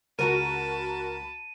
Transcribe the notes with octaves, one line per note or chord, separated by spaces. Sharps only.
C#2 F#4 A#4 A5 B5 D#7